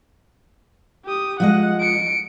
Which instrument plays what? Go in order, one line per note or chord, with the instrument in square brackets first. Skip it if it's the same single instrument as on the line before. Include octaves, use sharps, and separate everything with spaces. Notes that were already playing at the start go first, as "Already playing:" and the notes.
[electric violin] G4 D#6
[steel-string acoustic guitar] F3 G#3 D#5 [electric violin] F#5
[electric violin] C#7 D7